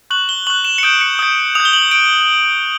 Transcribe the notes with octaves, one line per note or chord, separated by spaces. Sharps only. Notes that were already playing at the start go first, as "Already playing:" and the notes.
C#6 F#6 F#7
G7
C#6 F#6 F#7
E7
C#7
D#6 G6 D7
C#7
D#6 G6
D#6 G6 F7
G7
F#7
D7